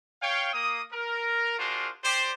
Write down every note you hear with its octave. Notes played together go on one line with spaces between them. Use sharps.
C#5 F5 G5
A#3 D#6
A#4
D4 F4 F#4 G#4 A#4 C5
G4 C5 D5